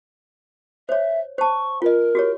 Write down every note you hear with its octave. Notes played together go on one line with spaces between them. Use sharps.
C5 C#5 E5
C5 A5 C#6
F4 A#4 D#5
F#4 G4 C#5